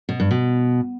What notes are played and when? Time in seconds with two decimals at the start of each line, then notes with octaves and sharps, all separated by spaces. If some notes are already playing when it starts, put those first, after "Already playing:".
0.09 B2
0.20 G2
0.31 B2